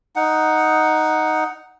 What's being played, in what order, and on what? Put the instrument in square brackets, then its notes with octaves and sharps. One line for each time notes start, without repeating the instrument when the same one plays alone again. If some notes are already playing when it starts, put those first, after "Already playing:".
[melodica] D#4 F#5